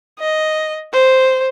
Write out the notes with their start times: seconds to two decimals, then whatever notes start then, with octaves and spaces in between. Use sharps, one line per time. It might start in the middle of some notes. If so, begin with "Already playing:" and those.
0.19 D#5
0.93 C5